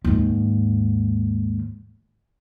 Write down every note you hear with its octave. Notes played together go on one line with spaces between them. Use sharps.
D#2 G#2